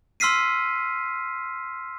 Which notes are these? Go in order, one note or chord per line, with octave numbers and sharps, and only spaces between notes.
C6 E6 F6 B6 C7 D#7